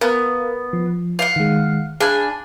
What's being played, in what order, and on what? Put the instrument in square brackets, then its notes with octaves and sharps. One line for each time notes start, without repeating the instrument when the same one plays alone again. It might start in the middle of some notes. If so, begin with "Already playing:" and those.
[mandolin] B3 [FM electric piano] A#4 F5
[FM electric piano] F3
[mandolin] F5 F#5
[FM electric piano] D#3 G#3
[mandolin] D4 G#5 [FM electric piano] G#4 F5 B5